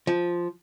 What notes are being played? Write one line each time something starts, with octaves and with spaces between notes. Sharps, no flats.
F3